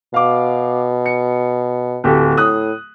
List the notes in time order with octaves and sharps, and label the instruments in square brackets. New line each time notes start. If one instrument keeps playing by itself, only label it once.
[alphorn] B2 [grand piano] F5 D6
[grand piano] C#7
D1 G4 A4
[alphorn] A2 [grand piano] D#6 F#6